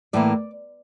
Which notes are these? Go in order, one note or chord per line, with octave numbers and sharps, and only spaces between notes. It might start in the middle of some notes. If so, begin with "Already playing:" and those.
A2 E3 A#3 D5